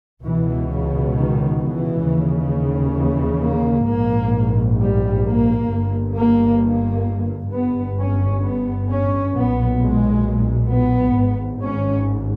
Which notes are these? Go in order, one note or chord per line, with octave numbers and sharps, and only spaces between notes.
C#2 B2 E3
C#3
D#3
E3
D#2 C#3
E3
A#3
A#1 G#2 A#3
G3
A#3
G1 G2
A#3
A#3
G1 G2 B3
C#4
B3
C#4
B1 A#2 B3
G#3
B3
G#1 G#2
C#4